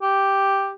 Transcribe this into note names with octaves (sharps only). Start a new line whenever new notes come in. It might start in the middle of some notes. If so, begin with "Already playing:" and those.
G4